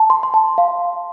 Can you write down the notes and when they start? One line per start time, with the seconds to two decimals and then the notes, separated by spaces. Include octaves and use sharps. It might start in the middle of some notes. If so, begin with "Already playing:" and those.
Already playing: A5
0.10 C6
0.23 C6
0.34 A5
0.58 F5